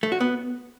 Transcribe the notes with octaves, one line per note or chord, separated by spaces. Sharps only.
A3
F#4
B3